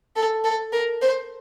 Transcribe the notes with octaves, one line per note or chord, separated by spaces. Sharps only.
A4
A4
A#4
C5